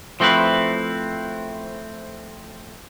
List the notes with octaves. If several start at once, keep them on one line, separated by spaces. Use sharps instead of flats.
F3 A3 C4 E4 B4